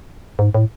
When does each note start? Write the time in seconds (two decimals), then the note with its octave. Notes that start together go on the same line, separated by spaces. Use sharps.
0.39 G#2
0.55 A2